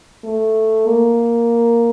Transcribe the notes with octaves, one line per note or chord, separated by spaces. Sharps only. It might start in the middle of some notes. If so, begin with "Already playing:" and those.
A3
A#3